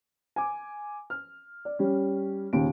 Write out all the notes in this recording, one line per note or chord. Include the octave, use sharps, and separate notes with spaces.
G#5 D6
F6
D5
G3 C#4
D#1 D#2 C#3 D7